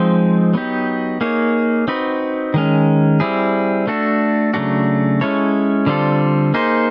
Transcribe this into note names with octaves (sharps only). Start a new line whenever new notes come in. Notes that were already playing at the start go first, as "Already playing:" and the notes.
Already playing: F3 G#3 C4 D#4
F#3 B3 D#4 G4
A#3 D#4 G#4 C#5
C4 D#4 F#4 B4
D#3 G#3 C#4
G3 C4 E4 G#4
A3 D4 F#4 A4
C#3 F#3 A3 D4 F#4
G#3 C#4 E4 A4 C#5
D3 G3 C4 F4 A4
A#3 D#4 G#4 C5